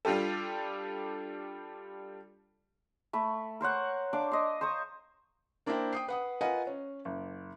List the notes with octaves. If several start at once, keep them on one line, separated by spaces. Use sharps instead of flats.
G3 D4 F4 G4 A4
A3 B5
A#4 C5 C#5 F#5
D4 F5 D6
D#5 C6
C5 A#5 C#6 D#6
A#3 D4 E4 A#4 C5 G5
G5 D#6 C7
B4 F#5 D#6
F4 A#4 B4 D#5 F#5 G#5
C#4
F#1